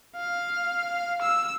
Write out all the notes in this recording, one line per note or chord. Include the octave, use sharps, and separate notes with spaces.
F5
E6